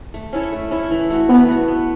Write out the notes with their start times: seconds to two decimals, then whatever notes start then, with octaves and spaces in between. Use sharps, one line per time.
0.14 A3
0.33 C#4 E4 A4
0.52 A3
0.71 C#4 E4 A4
0.91 E3
1.10 A3 F#4
1.29 E3 B3
1.49 A3 F#4
1.68 B3